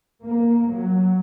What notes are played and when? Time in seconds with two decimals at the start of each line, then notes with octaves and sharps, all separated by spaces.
0.23 A#3
0.71 F#3